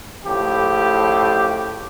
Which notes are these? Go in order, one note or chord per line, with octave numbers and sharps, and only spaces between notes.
C#2 A2 F3 G4